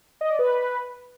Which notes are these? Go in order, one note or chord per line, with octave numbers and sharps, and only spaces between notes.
D#5
D5
B4